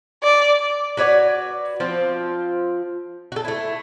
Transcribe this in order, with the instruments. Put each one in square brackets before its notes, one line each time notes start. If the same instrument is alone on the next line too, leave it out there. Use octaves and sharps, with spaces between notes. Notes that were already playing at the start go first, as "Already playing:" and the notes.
[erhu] D5
[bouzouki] F#4 B4 C#5 D5
F3 C4 F4
F#4 A4
A3 E4